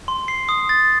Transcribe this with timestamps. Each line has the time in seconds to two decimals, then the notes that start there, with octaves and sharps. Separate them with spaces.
0.08 C6
0.28 C7
0.49 D#6
0.69 A6